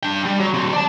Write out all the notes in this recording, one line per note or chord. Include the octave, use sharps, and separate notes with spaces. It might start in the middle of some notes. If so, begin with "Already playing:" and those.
D4 G5
G3
F#3
F#3 C4
D5 A5